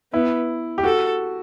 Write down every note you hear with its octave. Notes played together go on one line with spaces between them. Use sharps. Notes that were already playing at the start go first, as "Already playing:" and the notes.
B3 E4
G4
F#4 A4